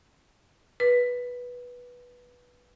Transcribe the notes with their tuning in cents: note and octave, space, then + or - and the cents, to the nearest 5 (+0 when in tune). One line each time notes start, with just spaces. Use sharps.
B4 -10